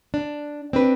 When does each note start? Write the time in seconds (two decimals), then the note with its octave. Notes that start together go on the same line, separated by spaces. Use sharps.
0.14 D4
0.73 C4 D4 B4